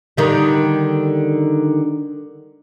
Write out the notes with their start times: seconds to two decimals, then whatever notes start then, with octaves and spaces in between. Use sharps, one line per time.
0.17 D3 D#3 G3